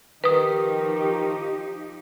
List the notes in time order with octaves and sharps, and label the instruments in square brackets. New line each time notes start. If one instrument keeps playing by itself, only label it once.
[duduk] D#3 [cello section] F3 D#4 G4 [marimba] B4 D#6